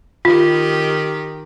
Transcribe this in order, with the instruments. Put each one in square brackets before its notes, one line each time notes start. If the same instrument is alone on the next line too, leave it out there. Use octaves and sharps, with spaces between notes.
[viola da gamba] D#3 G4 [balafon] F4